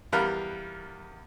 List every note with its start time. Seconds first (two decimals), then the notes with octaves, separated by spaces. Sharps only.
0.12 E2 G3 A#4 F5 B5 F#6